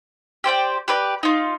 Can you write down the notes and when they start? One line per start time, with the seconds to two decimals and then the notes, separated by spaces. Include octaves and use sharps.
0.44 G4 C5 D5 G5
0.88 G4 B4 D5
1.23 D#4 F4